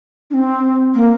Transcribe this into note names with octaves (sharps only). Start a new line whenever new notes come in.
D4
C4
A#3